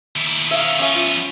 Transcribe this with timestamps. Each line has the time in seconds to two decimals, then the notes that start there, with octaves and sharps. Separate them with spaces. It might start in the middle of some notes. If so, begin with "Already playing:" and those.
0.16 D#2 E4
0.51 D#3 C#4 E5 F5
0.79 F3 B3 C#4 E5
0.95 F4